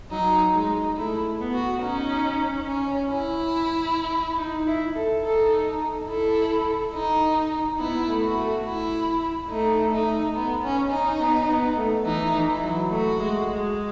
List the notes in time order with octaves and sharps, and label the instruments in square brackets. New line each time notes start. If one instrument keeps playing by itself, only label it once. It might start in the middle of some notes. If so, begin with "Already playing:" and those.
[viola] F#3 [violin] D#4
[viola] G#3 [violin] D#4
[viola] A3 [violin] E4
[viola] B3
[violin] F#4
[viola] C#4 [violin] D#4
[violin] C#4
E4
[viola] D#4
E4
A4
[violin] D#4 [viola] A4
[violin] E4 [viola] A4
[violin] D#4
[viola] B3 [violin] E4
[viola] A3
[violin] F#4
[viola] A3
[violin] E4
[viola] A3 [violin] D#4
[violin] D#4
B3
C#4
D#4
[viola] B3
B3
A3
[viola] E3 [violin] D#4
[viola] E3
[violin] E4
[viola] F#3
[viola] A3 [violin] F#4
[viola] G#3
G#3